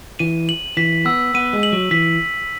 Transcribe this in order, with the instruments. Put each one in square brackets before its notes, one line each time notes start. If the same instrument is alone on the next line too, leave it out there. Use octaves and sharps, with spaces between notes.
[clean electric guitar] E3 [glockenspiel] D#7
[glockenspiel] F#7
[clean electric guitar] E3 [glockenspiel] B6
[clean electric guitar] B3 [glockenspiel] E6
[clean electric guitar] B3 [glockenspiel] D#7
[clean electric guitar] G#3
[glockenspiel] F#7
[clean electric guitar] F#3
[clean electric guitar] E3 [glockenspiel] B6